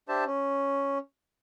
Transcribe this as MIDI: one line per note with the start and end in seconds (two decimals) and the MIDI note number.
0.09 0.24 62
0.09 0.24 67
0.09 0.24 72
0.09 0.24 76
0.09 0.24 81
0.26 0.98 61